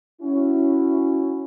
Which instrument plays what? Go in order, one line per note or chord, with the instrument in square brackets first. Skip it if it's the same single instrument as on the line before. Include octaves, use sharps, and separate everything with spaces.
[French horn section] C#4 E4 F#4